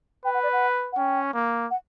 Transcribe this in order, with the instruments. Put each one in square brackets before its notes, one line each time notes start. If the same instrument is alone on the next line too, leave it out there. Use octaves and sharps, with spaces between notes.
[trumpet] B4 [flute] G5
[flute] F#5
D5
F#5
F#5
[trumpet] C#4 [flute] G5
[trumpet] A#3
[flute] F#5